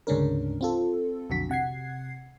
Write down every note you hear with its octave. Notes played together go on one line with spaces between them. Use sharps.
D2 G#2 C#3 C#4 D4 A#4
C4 F4 A4
B1 F2 D3 F#4 B6
C3 F#5 G#6 C7